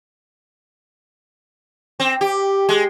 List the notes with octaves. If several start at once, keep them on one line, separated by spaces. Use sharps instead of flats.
C4
G4
G#3